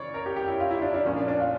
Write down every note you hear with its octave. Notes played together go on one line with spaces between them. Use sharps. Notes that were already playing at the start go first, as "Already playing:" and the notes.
Already playing: C#3 E3 C#5 D5
A#4
G4
G4
E4
F4
E4
D4
D4
A#2 F3 A#3 C#4
D4
D4
F4